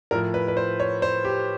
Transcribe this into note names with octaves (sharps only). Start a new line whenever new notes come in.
A2 F3 A#4
B4
B4
C5
C#5
C5
G4